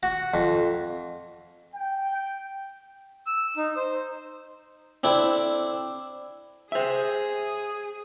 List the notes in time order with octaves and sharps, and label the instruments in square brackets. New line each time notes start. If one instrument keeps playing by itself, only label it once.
[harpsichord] F#4
F2
[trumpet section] G5
[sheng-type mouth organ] E6
D#4
C5
[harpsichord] C4 D4 E4 A4
[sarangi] G#4 [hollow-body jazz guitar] C5 E5